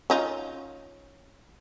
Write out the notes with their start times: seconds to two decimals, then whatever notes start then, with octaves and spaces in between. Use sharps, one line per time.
0.10 C#4 D#4 F4